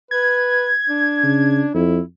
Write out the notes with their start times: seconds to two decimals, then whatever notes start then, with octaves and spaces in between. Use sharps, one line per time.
0.11 B4 G#6
0.88 D4
1.23 C#3
1.74 F2 E4